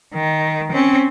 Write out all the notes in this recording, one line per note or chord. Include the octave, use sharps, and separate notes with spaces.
D#3
C4 C#4